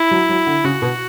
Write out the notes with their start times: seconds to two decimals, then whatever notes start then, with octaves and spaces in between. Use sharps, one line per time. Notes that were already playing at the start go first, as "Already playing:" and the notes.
Already playing: E4
0.11 F#3
0.29 F#3
0.46 D3
0.64 C#3 F#4
0.82 B2